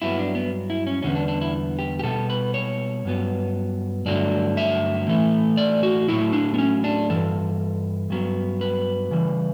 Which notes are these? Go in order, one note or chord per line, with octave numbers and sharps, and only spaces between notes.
G2 F#3 B3 E4
D4
B3
E4
C#4
E2 D3 G3 B3 C#4
D4
D4
E4
G4
G4
B2 G3 B3 A4
B4
C#5
G2 F#3 B3
G2 D3 F#3 A3 D5
E5
A2 E3 A3
D5
F#4
A2 F#3 A3 E4
D4
B3
C#4
D4
G2 E3 A4
G2 F#3 B3
B4
C#3 E3 G3